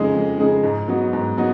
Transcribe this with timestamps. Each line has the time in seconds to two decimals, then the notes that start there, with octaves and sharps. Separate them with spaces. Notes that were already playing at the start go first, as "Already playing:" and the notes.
Already playing: F2 C#3 G#3 D#4 G#4
0.13 F2
0.38 C#3 G#3 D#4 G#4
0.63 G#2
0.88 F#3 B3 D#4 F#4
1.13 G#2
1.37 F#3 B3 D#4 F#4